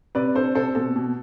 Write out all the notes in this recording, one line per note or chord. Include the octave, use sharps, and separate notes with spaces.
C3 B4 D5
D4 A4 C5
C3 A4 C5
B2 A4
B2